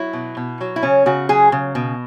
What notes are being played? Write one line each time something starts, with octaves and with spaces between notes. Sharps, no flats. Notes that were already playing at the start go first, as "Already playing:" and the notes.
Already playing: F#3 E4
B2
B2
F#3
E4
C#3 C#4
C#3 F#4
F#3 G#4
C#3
B2